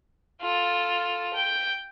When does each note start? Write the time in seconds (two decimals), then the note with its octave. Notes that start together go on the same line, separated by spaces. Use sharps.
0.42 F4 A4
1.34 G5